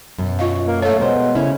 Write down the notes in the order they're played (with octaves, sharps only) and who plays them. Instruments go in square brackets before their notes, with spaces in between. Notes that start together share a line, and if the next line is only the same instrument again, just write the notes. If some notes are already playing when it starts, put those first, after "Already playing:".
[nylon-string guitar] F#2 B2
[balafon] F4 D#5 F5
[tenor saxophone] A#3
[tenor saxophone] A3 [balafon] C#5 E5 F5
[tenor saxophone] B2 [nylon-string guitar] G#3 A#4 C5
[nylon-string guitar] C#3 C#4 E4